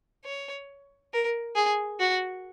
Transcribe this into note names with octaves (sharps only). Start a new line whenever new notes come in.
C#5
A#4
G#4
F#4